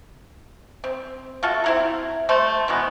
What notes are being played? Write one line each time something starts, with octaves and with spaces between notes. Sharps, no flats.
C4
F4 F#4 A4 E5
C4 E4 A#5
G3 A3 C5
B2 E3 G#3 B3